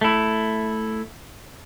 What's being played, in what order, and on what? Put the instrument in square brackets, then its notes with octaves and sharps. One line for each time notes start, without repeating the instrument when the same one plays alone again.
[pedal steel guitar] A3 E4